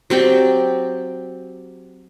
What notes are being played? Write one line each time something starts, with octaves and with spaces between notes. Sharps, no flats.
F#3 C4 G4 D5